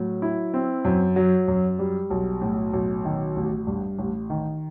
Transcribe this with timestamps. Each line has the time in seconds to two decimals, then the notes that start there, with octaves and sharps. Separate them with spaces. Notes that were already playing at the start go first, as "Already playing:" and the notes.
Already playing: A2 F#3
0.22 E4
0.54 C4
0.85 F#2
1.16 F#3
1.48 F#2
1.79 G3
2.10 B1
2.41 A2
2.73 B1
3.05 D#3
3.36 A1
3.67 G2
3.99 A1
4.30 D#3